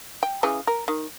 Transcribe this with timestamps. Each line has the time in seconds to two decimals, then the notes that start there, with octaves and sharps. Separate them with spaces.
0.23 G5
0.43 C#3 E3 G#4
0.67 A#4
0.88 D#3